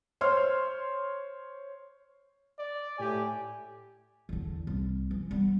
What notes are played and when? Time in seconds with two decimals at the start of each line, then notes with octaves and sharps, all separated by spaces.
0.21 C5 C#5 C6 F6
2.59 D5
2.98 A2 G4 G#5
4.29 E2 D3
4.67 C2
5.11 E3
5.31 G3 B3